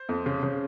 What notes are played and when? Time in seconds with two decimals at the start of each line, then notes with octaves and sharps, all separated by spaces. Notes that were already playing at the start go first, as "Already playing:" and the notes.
Already playing: C5
0.09 F2
0.26 C#3
0.43 C#3